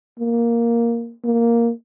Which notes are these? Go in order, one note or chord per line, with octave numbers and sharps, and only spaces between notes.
A#3
A#3